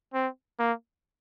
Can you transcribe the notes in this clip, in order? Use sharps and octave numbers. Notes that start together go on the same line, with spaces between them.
C4
A#3